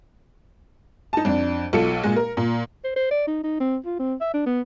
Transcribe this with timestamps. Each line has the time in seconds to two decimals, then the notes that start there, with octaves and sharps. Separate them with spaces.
1.13 D#4 A5
1.25 F2 D4
1.73 B1 F4 A4 C#7
2.03 A#2 G#3
2.16 A#4
2.37 A#2
2.84 C5
2.96 C5
3.11 D5
3.27 D#4
3.44 D#4
3.60 C4
3.86 F4
3.99 C4
4.21 E5
4.34 D4
4.46 B3